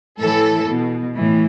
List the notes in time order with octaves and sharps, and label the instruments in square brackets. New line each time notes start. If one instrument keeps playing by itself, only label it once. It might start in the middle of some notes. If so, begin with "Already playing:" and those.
[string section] A2 E3 A4
B2
A2 E3